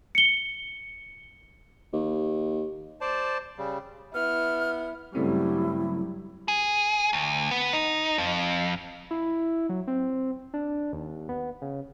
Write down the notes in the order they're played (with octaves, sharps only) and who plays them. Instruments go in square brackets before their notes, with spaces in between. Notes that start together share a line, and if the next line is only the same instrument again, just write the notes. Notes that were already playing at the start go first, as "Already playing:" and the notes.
[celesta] C#7 G7
[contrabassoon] D#2
[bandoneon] C5 D5 A5
C#3 G3
[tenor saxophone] B3 [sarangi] E4 [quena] F6
[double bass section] G2 F#3 G3 [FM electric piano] C#3 A3 C4 [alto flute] E4
[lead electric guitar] G#4
D2
B3
D#4
F2
[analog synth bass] E4
F#3
C4
D4
D#2
B3
C#3